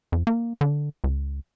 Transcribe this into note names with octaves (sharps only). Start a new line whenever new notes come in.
F2
A#3
D3
C#2